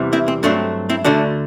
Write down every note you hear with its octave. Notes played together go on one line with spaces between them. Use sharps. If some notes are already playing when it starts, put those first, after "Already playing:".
Already playing: E2 C3 E3 G3
C4 E4
C4
G2 F#3 A3 C4 D4
C4 E4
D2 D3 A3 D4 F#4